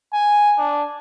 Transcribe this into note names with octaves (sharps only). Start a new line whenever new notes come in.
G#5
D4